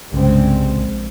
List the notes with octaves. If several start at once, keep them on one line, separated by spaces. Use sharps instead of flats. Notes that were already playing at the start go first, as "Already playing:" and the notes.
C2 G2 C#3 G#3 C4
A#1